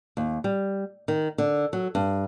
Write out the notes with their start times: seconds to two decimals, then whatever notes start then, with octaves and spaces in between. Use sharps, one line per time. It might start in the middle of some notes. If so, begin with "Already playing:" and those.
0.17 D#2
0.44 G3
1.08 D#3
1.38 D3
1.73 F#3
1.95 G2